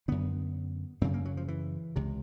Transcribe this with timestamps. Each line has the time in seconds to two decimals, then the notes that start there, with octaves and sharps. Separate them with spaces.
0.08 F#2 D3 B3
1.01 F#2 C#3 C4
1.14 A#3
1.25 F#3
1.37 F3
1.48 E3
1.96 C#2 C3